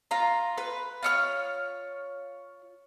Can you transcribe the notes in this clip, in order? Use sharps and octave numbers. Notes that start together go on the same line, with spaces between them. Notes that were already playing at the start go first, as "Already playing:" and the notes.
F4 A#5
B4
F4 C#5 F6